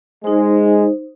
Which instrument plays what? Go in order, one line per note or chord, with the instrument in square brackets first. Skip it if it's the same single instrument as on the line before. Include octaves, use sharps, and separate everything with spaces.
[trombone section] G#3 [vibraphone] D#4 C5